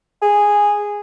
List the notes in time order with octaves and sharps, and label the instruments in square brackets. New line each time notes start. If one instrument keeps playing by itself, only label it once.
[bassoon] G#4